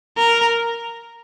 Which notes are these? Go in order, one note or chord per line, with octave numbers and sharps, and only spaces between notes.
A#4